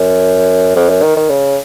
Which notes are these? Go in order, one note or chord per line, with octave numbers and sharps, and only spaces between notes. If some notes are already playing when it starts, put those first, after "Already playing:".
Already playing: F#2
F2
F#2
D#3
D#3
C#3